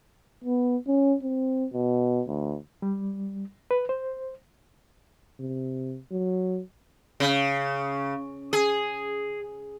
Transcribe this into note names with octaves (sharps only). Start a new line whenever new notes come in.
B3
C#4
C4
B2
D2
G3
B4
C5
C3
F#3
C#3
G#4